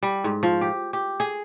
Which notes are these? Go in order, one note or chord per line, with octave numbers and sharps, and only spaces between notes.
G3
G#2
F3
G4
G4
G#4